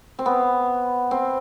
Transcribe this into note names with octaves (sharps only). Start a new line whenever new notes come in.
C4
B3
C4